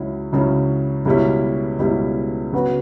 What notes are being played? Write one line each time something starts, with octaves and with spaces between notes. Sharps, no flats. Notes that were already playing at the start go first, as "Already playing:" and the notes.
Already playing: C#2 C#3 F#3 C#4 E4
C#2 C#3 F#3 C#4 E4
C#2 B2 G3 C#4 E4
C#2 B2 G3 C#4 E4
C#3 F#3 B3 F#4 B4